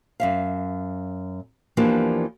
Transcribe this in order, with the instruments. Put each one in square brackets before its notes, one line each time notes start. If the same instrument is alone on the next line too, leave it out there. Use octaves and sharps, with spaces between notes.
[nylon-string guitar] F#2 E5 F5
E2 E3 F3 A#3 D4 G4